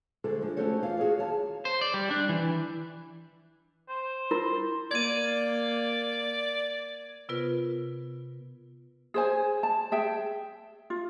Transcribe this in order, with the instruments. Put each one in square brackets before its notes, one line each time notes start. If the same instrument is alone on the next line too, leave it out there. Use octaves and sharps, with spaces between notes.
[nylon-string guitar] D2 G#3 A4 C5
F3 G#3 D4
A3 C#4 F#4 A4 C5 C#5
E2 F4 C#5 F5
F#4 G#4 A#4 C#5 F5
D#2 E4 C#5 F5 A5
[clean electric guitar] C5
D5
G3
D4
E3
[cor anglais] C5
[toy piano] E4 F4 A#4
[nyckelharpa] A#3 [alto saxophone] D5 [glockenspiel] G#6 D#7
[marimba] C3 B3 F4 A#4 B4
[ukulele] G#4 C5 G#5
A5
G#4 E5 G5
F4